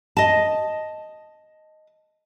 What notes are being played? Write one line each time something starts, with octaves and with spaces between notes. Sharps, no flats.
D#5 A5